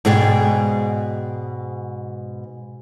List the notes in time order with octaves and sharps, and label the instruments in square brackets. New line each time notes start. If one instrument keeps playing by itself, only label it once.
[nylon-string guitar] G#2 B2 G#4 D5 G5